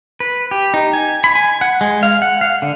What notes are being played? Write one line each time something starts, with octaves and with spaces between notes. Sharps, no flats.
B4
G4
D#4
G#5
B5
G#5
F#5
G#3
F5
F#5
F5
D3